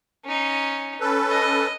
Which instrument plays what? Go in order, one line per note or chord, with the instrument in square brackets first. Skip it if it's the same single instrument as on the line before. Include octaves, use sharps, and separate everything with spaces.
[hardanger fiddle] C#4 D#4
[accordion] C#4 A4 B4
[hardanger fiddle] D#5